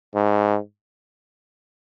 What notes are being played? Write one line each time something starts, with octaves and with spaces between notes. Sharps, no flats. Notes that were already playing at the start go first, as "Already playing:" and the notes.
G#2